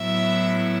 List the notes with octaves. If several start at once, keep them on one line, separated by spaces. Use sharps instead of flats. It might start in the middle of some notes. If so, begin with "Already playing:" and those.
Already playing: A2 F#3 B3 E4 E5